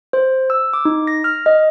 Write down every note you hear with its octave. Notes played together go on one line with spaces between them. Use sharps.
C5
E6
D6
D#4
A#6
F6
D#5